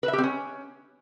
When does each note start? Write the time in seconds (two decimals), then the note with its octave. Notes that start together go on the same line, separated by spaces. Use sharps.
0.03 B4
0.08 E5
0.13 G4
0.18 C4
0.23 C#4